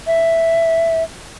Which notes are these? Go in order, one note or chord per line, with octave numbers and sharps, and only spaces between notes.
E5